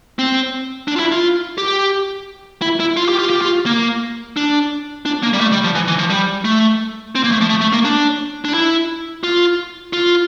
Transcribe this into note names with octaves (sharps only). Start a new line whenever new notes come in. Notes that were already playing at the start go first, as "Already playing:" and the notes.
C4
D4
F4
E4
F4
G4
E4
E4
F4
G4
F4
G4
F4
A#3
D4
D4
A#3
G3
A3
G3
F3
E3
E3
F3
G3
A3
C4
A#3
A3
F3
A3
A3
A#3
D4
D4
E4
F4
F4